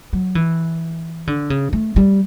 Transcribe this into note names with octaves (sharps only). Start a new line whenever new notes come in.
F#3
E3
D3
C#3
A3
G3